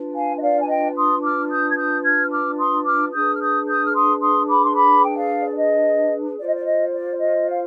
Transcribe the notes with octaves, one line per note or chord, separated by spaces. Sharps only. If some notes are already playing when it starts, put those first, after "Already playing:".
Already playing: D4 F4 B4
F5 G#5
D#5
D5 F5
G#5
D#5 G5
C6 D#6
D6 F6
D#6 G6
G#6
D#6 G6
F6 G#6
D6 F6
C6 D#6
D6 F6
D4 G#4 B4 D#6 G6
F6
D#6 G6
D#6 G6
F6
C6 D#6
C6 D#6
B5 D6
C6
B5 D6
G5
D5 F5
D5
D#5
F4 C5 D5
D#5
D5
D#5
D5
D#5
F5